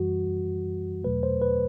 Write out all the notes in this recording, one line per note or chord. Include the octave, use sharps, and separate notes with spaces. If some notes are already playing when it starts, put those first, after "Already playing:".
Already playing: F#2 E3 G3 F#4
E2 B2 F#3 A3 B4
C5
B4